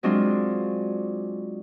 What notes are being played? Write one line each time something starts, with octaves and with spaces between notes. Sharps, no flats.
F#3 G#3 C4 D4 F4